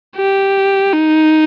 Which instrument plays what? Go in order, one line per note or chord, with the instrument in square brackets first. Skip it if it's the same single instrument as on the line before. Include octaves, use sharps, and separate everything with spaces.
[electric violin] G4
D#4